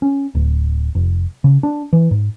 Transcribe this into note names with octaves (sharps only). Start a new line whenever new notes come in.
C#4
D1
F1
C#3
D4
E3
G#2